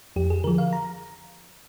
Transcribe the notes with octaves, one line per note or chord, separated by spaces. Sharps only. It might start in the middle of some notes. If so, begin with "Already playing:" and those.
F2 G4
G#4
D3 F3 A#4
F5
A#5